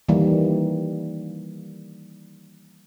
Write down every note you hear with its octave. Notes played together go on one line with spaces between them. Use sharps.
D#3 E3 G3 A#3